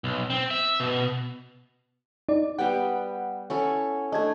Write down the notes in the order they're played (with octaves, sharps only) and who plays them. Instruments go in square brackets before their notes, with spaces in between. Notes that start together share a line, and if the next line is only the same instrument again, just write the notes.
[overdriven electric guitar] B1
C4
E5
B2
[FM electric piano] D#4 D5
[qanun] G3 B3 G5 [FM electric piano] F#5
[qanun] C#4 E4 A4
[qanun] A3 D4 [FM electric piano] D#5 G#6